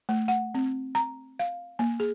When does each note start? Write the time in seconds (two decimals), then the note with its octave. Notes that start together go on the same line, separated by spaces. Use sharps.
0.09 A3
0.28 F#5
0.54 C4
0.95 A#5
1.39 F5
1.79 A#3
2.00 G#4